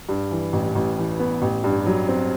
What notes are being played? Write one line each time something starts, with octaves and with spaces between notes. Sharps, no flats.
G2
E3
A1
A1
E3
B3
A1
G2
F#3
C4